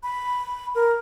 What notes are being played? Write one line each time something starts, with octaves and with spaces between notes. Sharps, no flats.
B5
A#4